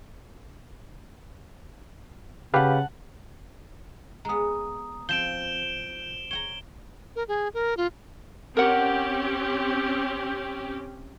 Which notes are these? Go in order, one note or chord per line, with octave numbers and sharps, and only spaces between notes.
C#3 G4 B4 F5 F#5 A5
G#3 B3 A#5 D#6
F3 C4 G6 D7 E7 G7
C#5 G5 A#5 G7
A#4
G#4
A#4
F4
C4 C#4 G4 A#4 F#5